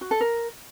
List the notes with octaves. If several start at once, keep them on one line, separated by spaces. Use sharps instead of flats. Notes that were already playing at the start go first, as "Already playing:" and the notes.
F#4
A4
A#4